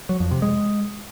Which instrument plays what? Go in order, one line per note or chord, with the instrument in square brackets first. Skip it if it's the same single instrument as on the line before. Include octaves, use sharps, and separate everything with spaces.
[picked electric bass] F#3
F2
C3
G#3